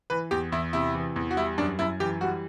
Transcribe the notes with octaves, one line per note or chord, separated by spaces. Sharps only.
E3 B4
E2 G4
E2 E4
C3 E4
E3
E2
F#4
G3 E4
F#2 D4
F#2 E4
E3 G4
G3 F#4